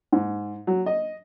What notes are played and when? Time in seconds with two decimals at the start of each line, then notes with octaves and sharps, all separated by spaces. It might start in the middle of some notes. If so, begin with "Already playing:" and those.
0.12 G#2
0.67 F#3
0.86 D#5